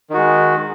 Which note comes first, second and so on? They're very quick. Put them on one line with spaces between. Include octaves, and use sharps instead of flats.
D#3 F#4 G#3